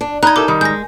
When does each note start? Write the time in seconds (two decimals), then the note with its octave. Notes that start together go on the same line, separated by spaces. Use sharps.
0.01 D4
0.23 D#4 A#5 F#6 G#6
0.36 E4 G4 A4 A#4 D6
0.48 D#3 G3
0.61 G#3 G6 A#6